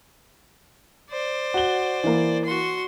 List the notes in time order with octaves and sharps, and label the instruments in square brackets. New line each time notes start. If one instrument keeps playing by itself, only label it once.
[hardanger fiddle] C5 D5
[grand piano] F#4 G7
E3 A#3
[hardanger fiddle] F#4 C6